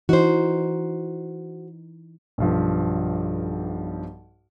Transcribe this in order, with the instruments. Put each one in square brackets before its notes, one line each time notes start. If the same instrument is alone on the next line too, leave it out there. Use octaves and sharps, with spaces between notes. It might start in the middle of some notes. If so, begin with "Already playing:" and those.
[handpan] E3 D#4 [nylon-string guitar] F#4 C5
[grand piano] B1 G2 F3